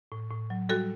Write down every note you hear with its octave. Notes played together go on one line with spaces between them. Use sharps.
A2
A2
F#3
G3 F#4 A4